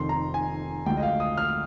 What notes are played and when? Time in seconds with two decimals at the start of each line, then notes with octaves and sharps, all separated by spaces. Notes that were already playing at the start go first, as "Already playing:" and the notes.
Already playing: F1 F2 D#3 C6
0.09 A#5
0.34 G#5
0.86 D2 D3 F3 G#3 G5
0.97 D#5
1.03 F5
1.20 D#6
1.38 F6